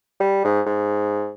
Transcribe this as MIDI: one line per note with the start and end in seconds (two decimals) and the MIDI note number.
0.20 0.40 55
0.44 0.61 44
0.66 1.32 44